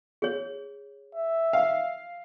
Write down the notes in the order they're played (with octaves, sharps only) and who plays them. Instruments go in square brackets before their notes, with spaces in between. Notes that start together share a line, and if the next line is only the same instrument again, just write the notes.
[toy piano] G#4 C#5
[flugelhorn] E5
[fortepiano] F5